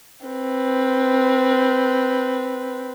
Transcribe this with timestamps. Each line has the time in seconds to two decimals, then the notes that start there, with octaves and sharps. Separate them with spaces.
0.26 C4 B4